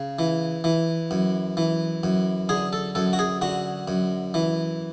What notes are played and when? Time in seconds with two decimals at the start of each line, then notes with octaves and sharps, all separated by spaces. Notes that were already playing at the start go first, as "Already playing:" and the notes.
Already playing: C#3
0.19 E3
0.64 E3
1.11 F#2
1.57 E3
2.03 F#2
2.49 D3 G#4
2.73 A4
2.95 F#2 A4
3.13 F#4
3.19 G#4
3.42 D3 F#4
3.88 F#2
4.34 E3